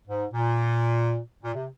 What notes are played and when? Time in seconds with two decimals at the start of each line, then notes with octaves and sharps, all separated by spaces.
0.08 G#2
0.33 A#2
1.43 A#2
1.54 C3